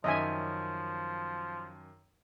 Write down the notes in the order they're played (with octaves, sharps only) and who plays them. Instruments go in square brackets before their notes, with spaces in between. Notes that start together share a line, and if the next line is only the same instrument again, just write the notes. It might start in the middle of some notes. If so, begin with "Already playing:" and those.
[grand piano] F#2 D#3 C#4 [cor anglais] F3 [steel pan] D#5 E5 G#5